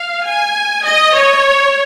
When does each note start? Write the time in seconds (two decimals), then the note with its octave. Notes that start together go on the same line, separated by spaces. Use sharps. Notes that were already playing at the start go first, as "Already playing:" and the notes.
Already playing: F5
0.24 G#5
0.84 D#5
1.14 C#5